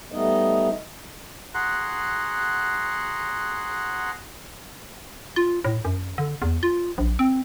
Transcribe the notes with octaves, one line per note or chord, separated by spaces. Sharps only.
G3 A3 B3 D#4 D#5
F#4 G#4 F#5 A#5 C6 F#6
F4
A2
F#2
D3
E2
F4
A#1
C4